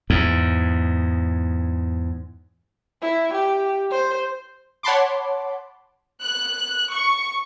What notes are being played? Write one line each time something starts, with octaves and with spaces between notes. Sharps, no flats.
E2 G#2
E4
G4
C5
C#5 F#5 A5 B5 C6 D6
F#6
C#6